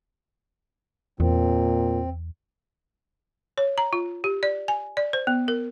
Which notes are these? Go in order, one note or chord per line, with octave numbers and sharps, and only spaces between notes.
E2 A#2 C4
C#5
A#5
F4
G4
D5
G#5
D5
C5
B3
A#4